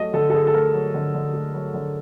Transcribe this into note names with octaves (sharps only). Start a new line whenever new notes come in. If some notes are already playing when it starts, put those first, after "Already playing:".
Already playing: F#3 A3 D#5
D3 A4
A4
D3 G#4
A4
A3 A#4
F#3
D3
D3
A3
F#3
D3